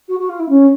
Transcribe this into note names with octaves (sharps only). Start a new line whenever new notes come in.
F#4
F#4
F4
E4
C#4